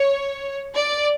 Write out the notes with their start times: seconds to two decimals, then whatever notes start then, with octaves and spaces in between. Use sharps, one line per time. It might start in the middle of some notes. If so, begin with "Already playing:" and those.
Already playing: C#5
0.75 D5